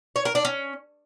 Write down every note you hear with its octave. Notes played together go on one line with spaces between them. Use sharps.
C#5
A#4
D4
C#4